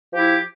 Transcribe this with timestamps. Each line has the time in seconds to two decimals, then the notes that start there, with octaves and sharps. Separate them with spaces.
0.12 F3
0.15 G4
0.17 E4